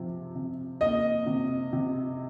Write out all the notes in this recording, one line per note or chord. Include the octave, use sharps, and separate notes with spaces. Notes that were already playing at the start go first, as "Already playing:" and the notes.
Already playing: C3 F3
C3
A#3 D#5
C3
C3